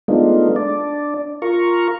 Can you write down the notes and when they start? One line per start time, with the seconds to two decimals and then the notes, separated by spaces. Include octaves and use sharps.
0.08 G#3 A3 B3 D4 D#4 F4
0.56 D4 D5
1.42 F4 A#4 A#5 C#6